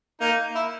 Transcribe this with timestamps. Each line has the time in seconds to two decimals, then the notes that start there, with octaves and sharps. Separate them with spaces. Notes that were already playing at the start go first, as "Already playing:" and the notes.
0.21 A#3 D#4
0.55 E4